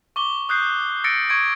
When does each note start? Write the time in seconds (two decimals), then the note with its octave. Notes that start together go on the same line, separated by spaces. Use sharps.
0.16 C#6 D6 G7
0.49 D#6 F#6 G6 C7
1.04 E6 A6 A#6 C#7 D7
1.29 C#6 G#6 D7